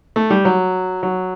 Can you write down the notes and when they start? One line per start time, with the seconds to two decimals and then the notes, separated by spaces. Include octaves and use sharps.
0.16 A3
0.30 G3
0.45 F#3
1.03 F#3